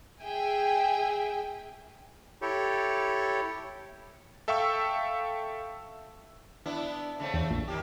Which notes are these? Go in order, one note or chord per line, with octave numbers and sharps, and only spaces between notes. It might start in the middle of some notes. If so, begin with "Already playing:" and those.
G#4 E5 G5 G#5
E4 G4 A4 C#5
A4 E5 F5 G5 C#6 E6
B3 D4 E4
C#3 A3 C4
E2
A#1
D#3 A#3 G4